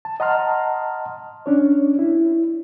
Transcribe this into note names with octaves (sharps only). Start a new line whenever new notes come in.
A5
D#5 F#5 A5 A#5 C6 F6
C#4 D4 C#5
E4